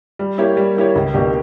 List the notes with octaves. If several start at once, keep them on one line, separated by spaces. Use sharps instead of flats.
G3
A#3 E4 G4 C#5
G3
A#3 E4 G4 C#5
C#2
B2 A#3 D4 G4